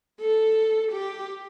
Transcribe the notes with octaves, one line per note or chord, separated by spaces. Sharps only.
A4
G4